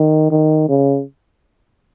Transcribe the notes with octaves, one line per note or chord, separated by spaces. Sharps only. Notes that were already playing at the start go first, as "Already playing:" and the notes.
Already playing: D#3
D#3
C#3